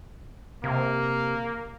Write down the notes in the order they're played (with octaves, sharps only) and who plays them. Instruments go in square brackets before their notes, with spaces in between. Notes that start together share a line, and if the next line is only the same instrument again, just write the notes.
[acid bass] C3 [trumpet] A#3